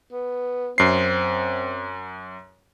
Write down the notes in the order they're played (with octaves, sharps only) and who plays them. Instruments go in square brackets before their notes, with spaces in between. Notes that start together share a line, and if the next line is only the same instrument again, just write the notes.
[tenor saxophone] B3
[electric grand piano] F#2 C7 [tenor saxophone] C4